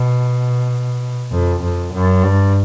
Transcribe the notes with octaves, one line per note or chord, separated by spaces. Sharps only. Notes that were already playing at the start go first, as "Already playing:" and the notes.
Already playing: B2
F2
F2
F#2
G2